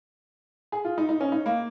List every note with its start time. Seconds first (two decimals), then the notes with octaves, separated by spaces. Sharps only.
0.72 G#4
0.85 F4
0.98 D#4
1.09 D#4
1.21 C#4
1.32 D#4
1.46 A#3